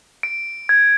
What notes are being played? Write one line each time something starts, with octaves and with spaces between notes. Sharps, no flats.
D7
G#6